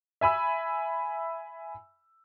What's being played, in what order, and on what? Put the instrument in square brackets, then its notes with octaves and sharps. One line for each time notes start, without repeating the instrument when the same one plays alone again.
[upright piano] E5 G#5 B5 E6